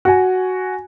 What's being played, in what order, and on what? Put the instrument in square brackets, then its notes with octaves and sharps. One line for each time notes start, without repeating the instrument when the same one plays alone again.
[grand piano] F#4 G#5